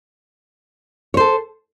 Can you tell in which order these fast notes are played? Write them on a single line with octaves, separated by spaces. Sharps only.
C#5 C5 A4